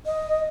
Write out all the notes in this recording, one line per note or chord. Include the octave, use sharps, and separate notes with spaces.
D#5